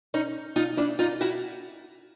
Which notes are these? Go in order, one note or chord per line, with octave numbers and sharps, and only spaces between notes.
C#4 D#4
D#4 F4
D4 E4
D#4 F4
E4 F#4